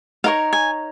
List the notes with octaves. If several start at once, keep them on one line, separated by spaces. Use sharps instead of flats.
D#4 A#4 C#5 F5
G#5